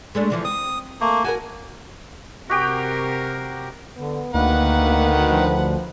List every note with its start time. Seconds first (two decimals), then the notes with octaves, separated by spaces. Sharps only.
0.15 G#3 A3 D4
0.30 D3 E3 F3
0.45 C4 D#6
1.01 A3 A#3
1.24 F#4 G4 A#4 G#5
2.50 C3 F#4 G4 A#4 G5
3.97 D3 B3
4.34 D2 D#3 A#3 B4 F#5
5.28 F3